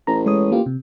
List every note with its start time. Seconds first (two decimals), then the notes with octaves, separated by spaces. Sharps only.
0.07 A1 A#5
0.26 G#3 C#5 D#6
0.52 A#3 F4 G4
0.66 C3